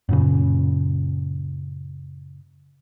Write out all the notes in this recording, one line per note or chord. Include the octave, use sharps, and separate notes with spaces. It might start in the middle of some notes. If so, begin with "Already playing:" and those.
F#2 A#2 C#3